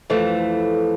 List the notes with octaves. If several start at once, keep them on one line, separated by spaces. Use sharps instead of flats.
F2 E3 A3